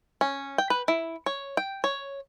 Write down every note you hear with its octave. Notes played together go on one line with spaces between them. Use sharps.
C#4
G5
B4
E4
C#5
G5
C#5